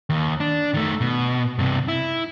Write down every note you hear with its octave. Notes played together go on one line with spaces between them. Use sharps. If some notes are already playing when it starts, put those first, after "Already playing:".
D#2
D4
D#3 A3
B2
G2 C3
E4